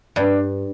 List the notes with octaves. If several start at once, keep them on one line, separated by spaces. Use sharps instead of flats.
G2 D4